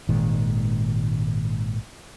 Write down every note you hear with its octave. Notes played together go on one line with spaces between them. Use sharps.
G#1 A#2 D#3 G#3